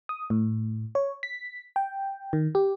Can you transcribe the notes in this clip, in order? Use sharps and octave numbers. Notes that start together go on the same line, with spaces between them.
D#6
A2
C#5
B6
G5
D#3
G4